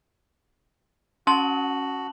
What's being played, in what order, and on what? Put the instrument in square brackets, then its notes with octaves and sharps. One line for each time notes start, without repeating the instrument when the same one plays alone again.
[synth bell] C#4 [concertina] F#4 [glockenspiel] A5 F#7 [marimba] C6